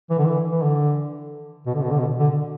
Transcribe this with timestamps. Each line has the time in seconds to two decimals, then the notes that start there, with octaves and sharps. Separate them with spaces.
0.10 E3
0.18 D3
0.26 E3
0.51 E3
0.62 D3
1.66 B2
1.74 D3
1.82 B2
1.90 D3
1.99 B2
2.19 D3